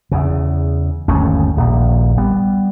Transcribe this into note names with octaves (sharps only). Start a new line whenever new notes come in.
E2 C#3
G1 D#2 A3 C#4
D#1 A#1 A#3
G3 B3